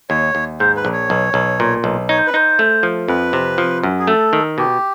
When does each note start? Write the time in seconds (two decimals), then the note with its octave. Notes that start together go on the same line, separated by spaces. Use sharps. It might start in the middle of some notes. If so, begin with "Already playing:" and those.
0.10 D#2 C#5
0.35 D#2
0.60 G#2 C5
0.77 B4
0.85 A#1
0.93 C#5
1.10 B1
1.34 B1
1.60 A#2
1.84 B1
2.09 D#4 C#5
2.18 C5
2.27 B4
2.34 D#4 C5
2.59 A3
2.83 F3
3.08 F2 B4
3.33 C3
3.58 F3
3.83 F#2
3.99 G#4
4.07 A3 A4
4.33 D#3
4.58 B2 G4